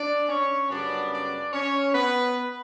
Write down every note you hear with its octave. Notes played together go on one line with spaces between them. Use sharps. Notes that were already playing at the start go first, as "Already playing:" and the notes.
Already playing: D4 D5
C#4 C#5
F#2 C#3 G3 B3 D4 D5
D4 D5
C#4 C#5
B3 B4